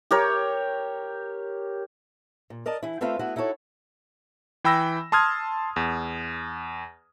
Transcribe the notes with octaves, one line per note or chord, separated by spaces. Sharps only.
G4 A#4 C#5
A#2
A#4 D5 D#5 A5
E3 E4
A3 C4 F4 B4 E5 F5
A3 B3 E4 F#4
D#4 E4 F#4 A4 C#5
E3 G5 B5 E6 A#6
A5 C6 D#6 F6 G#6
E2